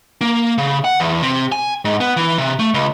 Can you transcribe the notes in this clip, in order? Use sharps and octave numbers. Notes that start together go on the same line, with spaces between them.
A#3
C#3
F#5
E2
C3
G#5
G#2
B3
E3
C3
A3
C#2